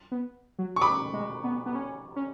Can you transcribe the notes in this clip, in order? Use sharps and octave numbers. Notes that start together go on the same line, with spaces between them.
B3
F#3
C#6
B5 D6
G#3
B3
B3
C#4
C#4